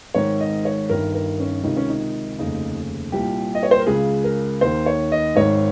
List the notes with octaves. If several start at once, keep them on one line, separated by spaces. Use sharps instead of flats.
G#1 G#2 D#3 C#5
D#5
C#5
G1 G2 D#3 A#4
A#4
C#4
C#2 C3 D#3 D#4
C#4
D#4
F1 D#2 C#3 D#4
C2 A#2 G4
D#5
C#5
C5
A#4
C#2 C#3 G#4
A#4
D#2 D#3 C5
C#5
D#5
G#1 G#2 D#3 C#5